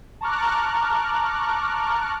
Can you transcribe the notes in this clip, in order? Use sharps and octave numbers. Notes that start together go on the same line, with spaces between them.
A5 A#5 C#6 D6 F6 F#6